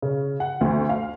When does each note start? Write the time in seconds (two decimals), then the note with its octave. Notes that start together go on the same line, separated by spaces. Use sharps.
0.02 C#3
0.40 F#5
0.61 D2
0.89 F5